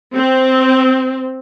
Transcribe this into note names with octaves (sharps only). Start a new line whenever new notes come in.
C4